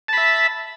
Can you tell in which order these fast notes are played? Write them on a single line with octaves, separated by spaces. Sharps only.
A5 B5 E5